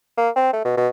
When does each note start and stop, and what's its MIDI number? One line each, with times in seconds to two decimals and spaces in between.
0.18 0.29 58
0.36 0.51 60
0.53 0.63 57
0.65 0.76 47
0.77 0.88 47